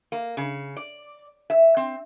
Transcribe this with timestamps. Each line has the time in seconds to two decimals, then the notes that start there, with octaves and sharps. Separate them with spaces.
0.12 A#3
0.37 C#3
0.77 D5
1.50 E5
1.77 C4